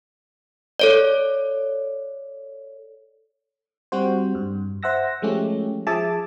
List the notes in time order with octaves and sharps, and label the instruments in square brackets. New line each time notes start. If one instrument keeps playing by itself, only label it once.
[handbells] A4 C#5 D5
[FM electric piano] G3 C4 F#4 C5
G2
C5 E5 F#5 E6 A#6
F3 G#3 A3 C#4 G4
F3 G#4 E5 G#5 A5 D6